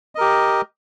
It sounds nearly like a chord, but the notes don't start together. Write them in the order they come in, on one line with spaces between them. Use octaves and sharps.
D#5 A#4 G4